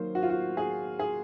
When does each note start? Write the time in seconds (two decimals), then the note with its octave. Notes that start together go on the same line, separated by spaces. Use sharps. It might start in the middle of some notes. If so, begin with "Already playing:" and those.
Already playing: D#3 F#3 A#3 C5
0.15 F#4
0.23 F4
0.30 F#4
0.57 G#4
0.99 G#4